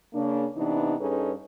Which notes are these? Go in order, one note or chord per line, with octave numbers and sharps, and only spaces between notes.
C#3 A#3 D4
C3 E3 B3 D4 D#4
G2 C#4 D#4 G#4 A4 B4